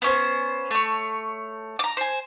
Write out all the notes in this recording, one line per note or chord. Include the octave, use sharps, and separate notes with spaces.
B3 C#4 C5
A3 C#5
A#5 D6
C5 G#5